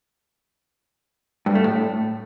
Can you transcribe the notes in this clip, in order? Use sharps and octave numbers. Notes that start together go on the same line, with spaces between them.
G2
A3
A2